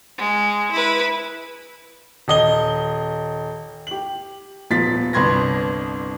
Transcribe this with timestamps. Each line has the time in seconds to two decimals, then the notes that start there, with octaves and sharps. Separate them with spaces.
0.18 G#3
0.72 E4 B4
2.28 D#1 D#5 G7
3.87 G4 F#7
4.70 D#1 F3 B3 F4 A6 B6
5.13 G1 C2 B4 C6 G#6 A#6